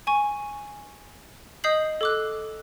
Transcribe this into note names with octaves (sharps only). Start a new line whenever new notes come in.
G#5 C#6
D#5 D#6 G6 C7 F#7
A4 D6 F#6